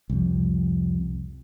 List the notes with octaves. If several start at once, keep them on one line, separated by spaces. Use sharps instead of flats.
C2 F2